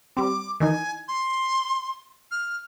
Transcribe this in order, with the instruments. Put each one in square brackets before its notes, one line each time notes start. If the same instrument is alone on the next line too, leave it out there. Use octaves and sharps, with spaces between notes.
[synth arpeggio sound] G3 C4 [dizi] D6
[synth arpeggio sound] D#3 E3 D#4 [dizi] G#5
[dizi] C6
F6